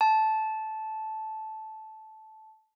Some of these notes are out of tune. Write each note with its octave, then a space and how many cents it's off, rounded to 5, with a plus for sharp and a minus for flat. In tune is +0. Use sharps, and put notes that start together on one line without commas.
A5 -10